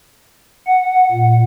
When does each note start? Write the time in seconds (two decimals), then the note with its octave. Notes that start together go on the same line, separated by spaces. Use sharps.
0.67 F#5
1.12 A#2